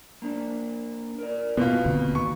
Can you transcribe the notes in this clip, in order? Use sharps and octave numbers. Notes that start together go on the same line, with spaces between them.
A#3 D4
A#4 D5
B2 A#3 B3 F4 F#4 B4
D2 D3 C4
D#3 C#6